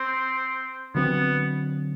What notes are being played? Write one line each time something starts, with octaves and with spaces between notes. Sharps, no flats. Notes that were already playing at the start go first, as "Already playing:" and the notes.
Already playing: C4
D3 F#3 A3 B3 C4